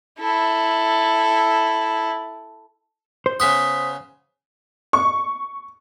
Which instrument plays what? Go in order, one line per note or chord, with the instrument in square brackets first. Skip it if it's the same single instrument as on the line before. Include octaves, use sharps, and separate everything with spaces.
[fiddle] E4 A4
[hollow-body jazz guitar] C5
[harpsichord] C#3 B3 F#5 [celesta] D#6 B6
[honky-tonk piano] C#6